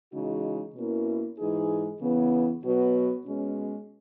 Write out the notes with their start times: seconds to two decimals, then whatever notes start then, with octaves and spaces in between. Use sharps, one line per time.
0.12 C#3 E3 G#3 D#4 F#4
0.75 B2 A#3 C#4 E4 A#4
1.38 G#2 E3 G#3 D#4 G#4
2.00 C#3 E3 B3
2.64 B2 F#3 B3 F#4 B4
3.26 B2 G#3 C#4